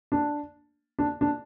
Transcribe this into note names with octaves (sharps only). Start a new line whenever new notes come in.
D4
D4
D4